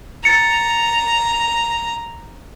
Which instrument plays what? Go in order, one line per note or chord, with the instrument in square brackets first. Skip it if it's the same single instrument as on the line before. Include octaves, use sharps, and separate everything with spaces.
[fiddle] A#5 [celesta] A6 C#7 F7